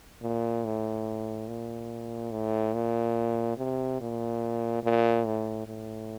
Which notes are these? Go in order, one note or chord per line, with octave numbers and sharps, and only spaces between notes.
A#2
A2
A#2
A2
A#2
C3
A#2
A#2
A2
A2